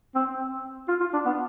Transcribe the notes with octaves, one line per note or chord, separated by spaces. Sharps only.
C4
F4
F4
D4
B3